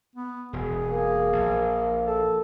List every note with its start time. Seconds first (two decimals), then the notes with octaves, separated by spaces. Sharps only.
0.16 B3
0.53 E1 G#4
0.91 A#3
1.33 A#1
2.06 A4